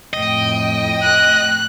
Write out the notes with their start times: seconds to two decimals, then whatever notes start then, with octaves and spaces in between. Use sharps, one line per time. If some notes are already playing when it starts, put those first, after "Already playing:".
0.13 F2 A2 D#5 G5
1.02 F#6